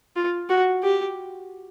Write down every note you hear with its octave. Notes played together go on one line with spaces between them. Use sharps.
F4
F#4
G4